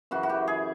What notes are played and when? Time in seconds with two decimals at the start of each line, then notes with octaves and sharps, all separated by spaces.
0.11 F#2 C#3 E3 F#4
0.23 F#4
0.29 G4
0.47 G#4